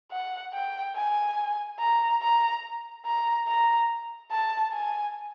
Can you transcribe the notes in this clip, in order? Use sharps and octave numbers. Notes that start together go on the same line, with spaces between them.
F#5
G5
G#5
A#5
A#5
A#5
A#5
A5
G#5